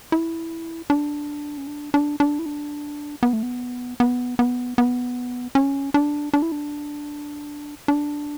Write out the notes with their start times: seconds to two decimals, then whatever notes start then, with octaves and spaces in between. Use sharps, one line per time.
0.12 E4
0.90 D4
1.58 C#4
1.67 D4
1.94 D4
2.20 D4
2.39 E4
2.46 D4
3.23 B3
3.33 A3
3.43 B3
4.00 B3
4.39 B3
4.78 B3
5.55 C#4
5.94 D4
6.34 D4
6.42 E4
6.52 D4
7.88 D4